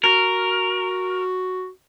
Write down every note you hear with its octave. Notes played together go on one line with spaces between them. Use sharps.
F#4 A#4